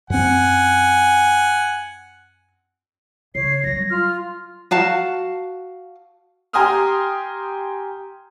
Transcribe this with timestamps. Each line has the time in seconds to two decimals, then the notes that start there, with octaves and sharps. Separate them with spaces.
0.10 F#2 C4 F#5 G#5
3.35 C#3 C#5 C7
3.64 F#3 G3 A#6
3.90 F4 F6
4.71 F#4 F5 A5
6.53 G4 G#5 A#5 C6 D#6 F6